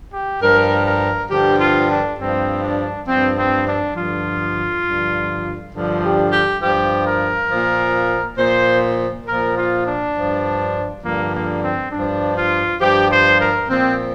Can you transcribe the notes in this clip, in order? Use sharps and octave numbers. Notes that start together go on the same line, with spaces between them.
G4
G2 F3 A#4
A#4
G2 D3 F3 G4
F4
D4
G2 F3 C4
D4
G2 F3 C4
C4
D4
G2 D3 F3 F4
G2 D3 F3
G2 D3 F3
G4
G4
G2 F3 G4
A#4
A#2 F3
A#2 F3 C5
A#2 F3 A#4
F4
D4
G2 F3
G2 D3 F3 A#3
A#3
C4
G2 F3 D4
F4
G2 F3 G4
C5
A#4
A#2 F3 C4